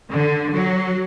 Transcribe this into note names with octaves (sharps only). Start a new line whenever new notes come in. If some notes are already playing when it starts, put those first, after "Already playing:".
D3
F#3